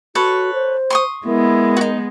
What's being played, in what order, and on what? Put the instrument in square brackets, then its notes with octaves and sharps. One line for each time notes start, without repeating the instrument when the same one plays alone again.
[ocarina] F#4 [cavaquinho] A4 B4 C#5
[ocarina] C5
[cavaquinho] C6 C#6 D#6
[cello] G#3 B3 [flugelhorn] E4 [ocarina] A#4
[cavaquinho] D#4 F#4